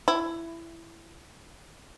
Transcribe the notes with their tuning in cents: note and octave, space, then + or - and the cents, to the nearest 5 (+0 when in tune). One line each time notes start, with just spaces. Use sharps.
E4 +15